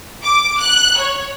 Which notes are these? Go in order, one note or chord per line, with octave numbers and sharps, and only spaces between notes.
D6
F#6
C#5